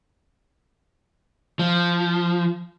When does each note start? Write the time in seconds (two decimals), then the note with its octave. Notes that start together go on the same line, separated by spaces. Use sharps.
1.59 F3